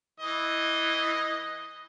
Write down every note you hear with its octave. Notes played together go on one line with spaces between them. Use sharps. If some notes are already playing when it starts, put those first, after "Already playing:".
E3 D#5